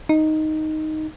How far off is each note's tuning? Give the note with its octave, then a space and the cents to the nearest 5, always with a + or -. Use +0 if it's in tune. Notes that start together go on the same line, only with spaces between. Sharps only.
D#4 +0